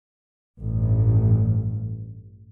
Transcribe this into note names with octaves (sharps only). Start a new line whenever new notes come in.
A1 G2